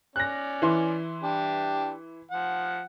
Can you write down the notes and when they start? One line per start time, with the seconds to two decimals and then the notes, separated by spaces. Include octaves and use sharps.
0.16 C#4 D5 F#6 A#6
0.62 E3 E4 C6
1.23 D4 G4
2.31 F3 F#5